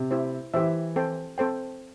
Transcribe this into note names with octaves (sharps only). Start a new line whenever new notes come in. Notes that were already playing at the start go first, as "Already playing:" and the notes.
Already playing: C3
E4 G4 C5 E5
E3 E4 G4 C5 E5
C4 A4 C5 G5
C4 A4 C5 G5